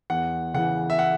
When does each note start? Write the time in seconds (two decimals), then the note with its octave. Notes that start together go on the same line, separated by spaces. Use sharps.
0.10 E2 F#5
0.54 C#3 E3 F#5
0.90 E5
0.99 F#5